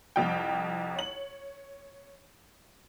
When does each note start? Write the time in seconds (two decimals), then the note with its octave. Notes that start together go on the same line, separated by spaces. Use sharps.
0.16 C2 F2 G5
0.96 C#5 F#7